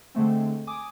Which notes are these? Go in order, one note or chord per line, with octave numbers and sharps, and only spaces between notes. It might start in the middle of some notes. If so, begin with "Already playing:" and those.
D3 G#3 A3 C4
G#5 D6 D#6